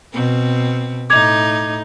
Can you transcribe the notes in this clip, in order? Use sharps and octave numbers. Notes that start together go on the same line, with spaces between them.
B2 C4
A2 D#4 D6 G#6 F7